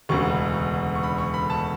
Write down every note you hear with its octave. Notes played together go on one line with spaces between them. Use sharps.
E1 D2 C#3 C#6
C#6
B5
C#6
B5
A5